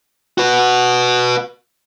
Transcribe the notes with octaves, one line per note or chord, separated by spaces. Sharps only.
F#4 B4